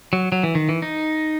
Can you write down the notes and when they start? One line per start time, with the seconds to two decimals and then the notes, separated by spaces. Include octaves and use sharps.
0.13 F#3
0.32 F#3
0.43 E3
0.55 D#3
0.69 E3
0.82 D#4